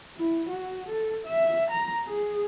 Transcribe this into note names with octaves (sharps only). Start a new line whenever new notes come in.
E4
F#4
A4
E5
A#5
G#4